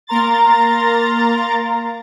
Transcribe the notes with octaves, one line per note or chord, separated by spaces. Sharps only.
A#3 A#4 A#5 C6 A6